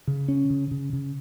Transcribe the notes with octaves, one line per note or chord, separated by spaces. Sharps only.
C#3
C#4
C#3
C#3
C#3